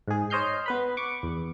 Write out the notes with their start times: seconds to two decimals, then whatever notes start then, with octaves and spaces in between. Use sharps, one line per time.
0.08 G#2 G#4
0.30 C5 C#5 D#5 F6 G6 C7
0.66 B3 B4 B5
0.97 C#6 D6
1.23 E2